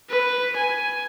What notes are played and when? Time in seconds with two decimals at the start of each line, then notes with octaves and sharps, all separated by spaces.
0.10 B4
0.57 G#5